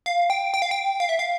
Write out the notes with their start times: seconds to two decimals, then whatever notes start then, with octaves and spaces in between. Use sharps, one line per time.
0.06 F5
0.30 G5
0.54 G5
0.62 F5
0.71 G5
1.00 F5
1.09 E5
1.19 F5